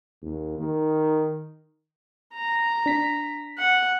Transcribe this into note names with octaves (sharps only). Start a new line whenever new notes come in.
D#2
D#3
A#5
D4 B6
F#5